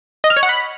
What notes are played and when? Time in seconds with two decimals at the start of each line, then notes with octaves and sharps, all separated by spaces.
0.24 D#5
0.30 F6
0.37 C#5
0.43 F#5
0.49 B5